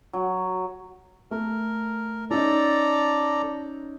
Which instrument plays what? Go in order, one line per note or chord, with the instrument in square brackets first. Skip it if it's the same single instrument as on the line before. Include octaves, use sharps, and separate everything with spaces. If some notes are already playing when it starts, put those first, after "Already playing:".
[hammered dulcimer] F#3
[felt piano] A3 [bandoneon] A#4
[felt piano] C#4 D#4 [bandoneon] A4 D5 A#5